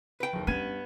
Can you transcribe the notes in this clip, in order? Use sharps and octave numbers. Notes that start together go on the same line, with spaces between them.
B4 G5
F#1 D#2
G2 B3 C#4 G#6 D#7